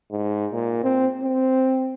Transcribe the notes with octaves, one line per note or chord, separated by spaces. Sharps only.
G#2
A#2
C4
C4